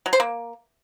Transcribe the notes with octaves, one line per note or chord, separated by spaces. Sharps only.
F#3
C5
A#3